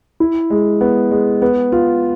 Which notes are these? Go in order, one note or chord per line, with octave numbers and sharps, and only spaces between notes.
E4
G#3
B3
G#3
B3
F4